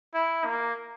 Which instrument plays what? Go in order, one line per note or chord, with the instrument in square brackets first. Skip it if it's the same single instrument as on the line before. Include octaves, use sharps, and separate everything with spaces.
[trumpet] E4
A#3